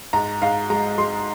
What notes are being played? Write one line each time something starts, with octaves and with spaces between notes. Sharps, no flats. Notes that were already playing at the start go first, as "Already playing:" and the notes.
G#2 A#5
G#2 F5
G#3 A#5
G#3 C6